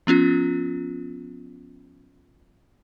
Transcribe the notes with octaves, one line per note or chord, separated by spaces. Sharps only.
F3 B3 C#4 F4